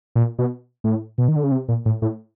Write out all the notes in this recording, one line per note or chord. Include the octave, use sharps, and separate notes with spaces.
A#2
B2
A2
B2
D#3
D3
C#3
C3
A#2
A2
A2